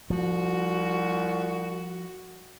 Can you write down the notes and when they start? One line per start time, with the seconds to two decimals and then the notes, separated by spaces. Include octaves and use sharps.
0.10 C2 F3 F#4